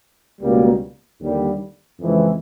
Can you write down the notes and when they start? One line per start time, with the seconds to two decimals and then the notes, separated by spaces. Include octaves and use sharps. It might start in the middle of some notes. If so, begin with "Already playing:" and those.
0.41 C#2 B2 G3 A#3
1.20 D#2 D3 G3 A#3
1.99 F2 C#3 E3 G#3